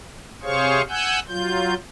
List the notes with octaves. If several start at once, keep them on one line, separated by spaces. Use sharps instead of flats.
C3 G#4 C5 C#5 F5 C#6
F#5 G#5 E6 F#6 G6
F#3 F4 G6